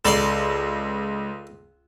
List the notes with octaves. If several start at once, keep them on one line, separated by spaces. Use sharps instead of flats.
C#2 A4 D5 C6